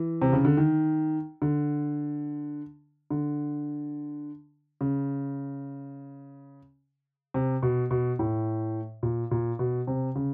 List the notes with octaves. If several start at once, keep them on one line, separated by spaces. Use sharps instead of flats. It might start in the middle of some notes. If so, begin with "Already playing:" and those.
Already playing: E3
C3
C#3
D3
D#3
D3
D3
C#3
C3
B2
B2
A2
A#2
A#2
B2
C3
C#3